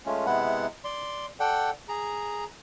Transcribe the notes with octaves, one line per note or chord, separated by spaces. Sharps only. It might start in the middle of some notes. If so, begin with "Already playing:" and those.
G#3 A3 C#4 F4
C3 G#3 B3 E4 F#5
D5 C6
A4 D5 F#5 G5
G#4 A#5